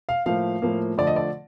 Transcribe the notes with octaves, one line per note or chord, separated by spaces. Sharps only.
F5
A2 F3 A#3 F5
A2 F3 A#3
D3 F3 A3 D5
D#5
D5